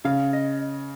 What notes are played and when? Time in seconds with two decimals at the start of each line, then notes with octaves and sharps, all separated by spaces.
0.05 C#3 F5
0.33 D#5